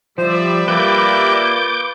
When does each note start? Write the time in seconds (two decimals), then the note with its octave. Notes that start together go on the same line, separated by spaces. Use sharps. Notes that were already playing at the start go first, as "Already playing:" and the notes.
0.18 F3 G3 C5 D5 E5
0.68 A#3 F4 B4 D6 G6